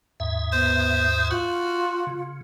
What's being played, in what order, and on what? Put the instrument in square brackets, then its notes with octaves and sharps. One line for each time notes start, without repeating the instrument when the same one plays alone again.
[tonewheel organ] D#2 G#2 E5
[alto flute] B3 [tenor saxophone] C5
[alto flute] F4 [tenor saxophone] F#4
[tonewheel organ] C#3